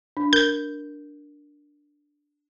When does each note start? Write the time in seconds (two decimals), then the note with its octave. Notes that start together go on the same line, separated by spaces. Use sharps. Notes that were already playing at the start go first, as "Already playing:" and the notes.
0.17 D4
0.33 A#4 G6